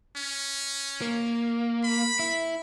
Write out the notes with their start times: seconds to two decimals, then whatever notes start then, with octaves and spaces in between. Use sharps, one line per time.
0.17 C#4
1.02 A#3
1.84 B5
2.19 E4